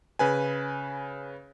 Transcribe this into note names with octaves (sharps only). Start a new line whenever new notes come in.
C#3 B4 G#5